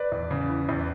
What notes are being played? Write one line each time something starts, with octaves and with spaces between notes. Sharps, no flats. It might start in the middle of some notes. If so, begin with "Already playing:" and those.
Already playing: B4 D5
E2
C#3
E3
E2